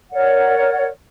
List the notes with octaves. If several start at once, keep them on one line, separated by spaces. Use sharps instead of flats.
A#4 C#5 D5 F#5